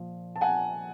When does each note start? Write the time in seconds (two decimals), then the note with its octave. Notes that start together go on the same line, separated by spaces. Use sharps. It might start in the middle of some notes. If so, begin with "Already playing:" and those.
Already playing: A#2 F3
0.36 A5
0.41 F#5 G#5